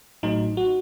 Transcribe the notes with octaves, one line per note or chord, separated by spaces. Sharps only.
A1 A2 F#3 D#4
F#4